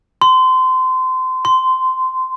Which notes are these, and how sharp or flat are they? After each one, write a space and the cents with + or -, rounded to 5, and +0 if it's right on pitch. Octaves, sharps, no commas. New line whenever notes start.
C6 -25
C6 -15